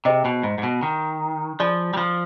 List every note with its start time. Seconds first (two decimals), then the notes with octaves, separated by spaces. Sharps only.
0.05 C3 G#4 C5 D#5
0.25 B2
0.43 G#2
0.58 G#2
0.63 B2
0.83 D#3
1.60 F3 G#4 D5 G#5 B5
1.93 G3
1.97 F3